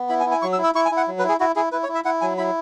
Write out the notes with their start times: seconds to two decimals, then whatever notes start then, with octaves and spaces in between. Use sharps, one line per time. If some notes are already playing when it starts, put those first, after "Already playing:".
Already playing: B3
0.09 E4 B5
0.20 G#5
0.26 E4
0.31 G#5
0.42 F#3 C#6
0.53 E6
0.58 E4
0.64 E6
0.75 E4 C#6
0.86 G#5
0.92 E4
0.97 F#5
1.08 F#3
1.19 B4
1.24 E4 G#4
1.40 E4 F#4
1.56 E4 G#4
1.72 E4 B4
1.83 C#5
1.89 E4
1.95 E5
2.05 E4 F#5
2.21 F#3 G#5
2.38 E4 B5